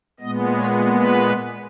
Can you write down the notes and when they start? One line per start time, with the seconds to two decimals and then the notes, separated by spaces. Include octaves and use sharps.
0.20 A#2 G#3 B3 D#5
0.56 C#5
0.90 B4